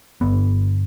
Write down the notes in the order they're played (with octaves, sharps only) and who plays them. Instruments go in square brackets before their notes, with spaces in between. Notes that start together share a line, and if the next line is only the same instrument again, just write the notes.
[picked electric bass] G1 B3